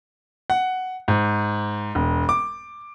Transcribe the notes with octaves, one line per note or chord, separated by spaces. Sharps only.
F#5
G#2
E1
D6